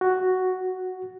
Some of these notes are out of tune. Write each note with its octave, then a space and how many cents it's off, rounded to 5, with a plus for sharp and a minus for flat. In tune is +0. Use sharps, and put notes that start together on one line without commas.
F#4 +5